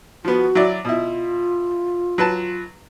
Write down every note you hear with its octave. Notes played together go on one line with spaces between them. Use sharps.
F3 B3 F#4
F#3 E4 D5
B2 E4 F4
F#3 B4 A5